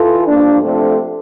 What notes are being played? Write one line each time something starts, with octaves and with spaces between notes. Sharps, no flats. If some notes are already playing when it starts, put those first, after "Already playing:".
Already playing: E3 F4 A4
G2 F3 A#3 D4
C3 F3 A3 D4 A4